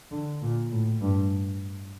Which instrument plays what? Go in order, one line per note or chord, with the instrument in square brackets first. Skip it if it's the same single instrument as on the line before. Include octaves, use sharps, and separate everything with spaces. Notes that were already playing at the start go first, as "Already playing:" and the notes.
[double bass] D3
A#2
A2
G2